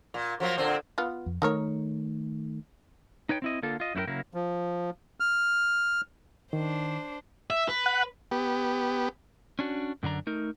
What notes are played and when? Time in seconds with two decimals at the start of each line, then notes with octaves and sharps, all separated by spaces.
0.14 A#2
0.40 F3 F#3 A#3
0.58 A#2 D3 C4
0.98 B3 F4
1.26 F2
1.42 D#3 A3 D#4 A#4 C#5
3.29 D#4 B4 C#5 G5
3.42 C4 E4 D#5
3.63 D3 A#3 F4 A4
3.80 F4 D#5
3.95 F#2 A#3 E4 F#4 A#4 G5
4.07 C#3 F#3 A#3 E4 A#4
4.34 F3
5.20 F6
6.53 D#3 D4 C5
7.50 E5
7.69 B4
7.86 F#5 F#6
8.31 B3 G4
9.59 C#4 D4 F#4
10.03 F#2 D3 D4 A#5
10.27 A3 D#4 A#4